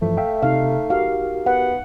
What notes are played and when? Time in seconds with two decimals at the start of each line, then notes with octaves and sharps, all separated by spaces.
0.02 G2 E3 F3 A3
0.17 E5 F5 G5
0.42 C3 D#4 F5
0.90 F#4 G4 A#4 F5
1.46 B3 F#5